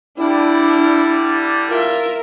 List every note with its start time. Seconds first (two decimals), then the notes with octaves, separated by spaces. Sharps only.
0.18 D3 G3 D4 E4
1.69 F4 A#4 E5